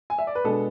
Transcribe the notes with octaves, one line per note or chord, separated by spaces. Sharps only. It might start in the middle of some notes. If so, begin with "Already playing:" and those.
G#5
E5
D5
B4
B2 G#3 B3 D4 A4